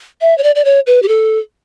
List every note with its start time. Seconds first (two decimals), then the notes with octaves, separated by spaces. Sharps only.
0.21 E5
0.38 C#5
0.43 D5
0.55 D5
0.65 C#5
0.87 B4
1.02 G4
1.08 A4